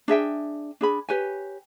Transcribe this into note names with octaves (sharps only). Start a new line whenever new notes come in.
D4 G#4 E5 G5
D4 G#4 B5
G4 B4 C#5 G#5